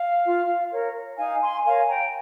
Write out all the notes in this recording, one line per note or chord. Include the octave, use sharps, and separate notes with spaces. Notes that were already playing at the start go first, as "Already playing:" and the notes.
Already playing: F5
F4
A#4 C#5
D#4 F5 G#5
G#5 C6
A#4 C#5 F5 G#5
G5 A#5